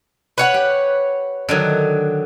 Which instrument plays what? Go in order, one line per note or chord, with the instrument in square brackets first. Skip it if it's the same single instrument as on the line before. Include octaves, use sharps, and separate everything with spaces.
[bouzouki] B4 C#5 F#5
[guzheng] G4
D3 D#3 F#3